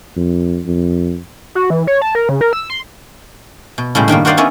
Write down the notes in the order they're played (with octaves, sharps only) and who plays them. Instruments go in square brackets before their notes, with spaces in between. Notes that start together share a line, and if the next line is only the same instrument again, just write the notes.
[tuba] F2
F2
[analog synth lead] F#4
E3
C#5
A5
A#4
C#3
A#4
E6
C6
[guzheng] B2
A2 C#3 G3 G#3
G2 D#3 G3 A#3
F#4 A#4 C5 D5 D#5 F5
B3 C#4 D#4 C#5 D5 E5